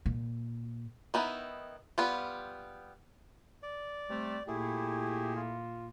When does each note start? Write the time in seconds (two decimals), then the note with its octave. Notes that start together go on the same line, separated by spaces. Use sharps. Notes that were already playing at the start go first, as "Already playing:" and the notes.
0.06 A#2
1.14 D#3 B3 D#4 E4
1.98 G3 B3 F4 G4
3.63 D5
4.10 C3 G3 A3 C4
4.48 A#2 A3 E4 G4 G#4
5.36 F4